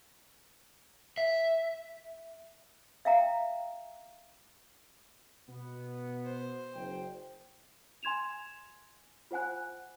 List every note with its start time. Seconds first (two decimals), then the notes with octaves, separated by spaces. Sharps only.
1.18 E5
3.05 E5 F5 G5 A#5
5.48 B2 B3
6.25 C5
6.74 F#1 G5
8.03 G#5 C6 G#6 E7 F7
9.31 F4 C5 F#5 G#5 F#6